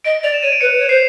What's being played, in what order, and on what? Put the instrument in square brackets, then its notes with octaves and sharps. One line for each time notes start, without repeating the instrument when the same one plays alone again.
[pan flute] D#5 [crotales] D7
[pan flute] D5 [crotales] F7
[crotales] E7
[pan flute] C#5 [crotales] D#7
[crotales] D7
[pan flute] B4 [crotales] C#7
[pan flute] C#5
[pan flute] C5 [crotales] C7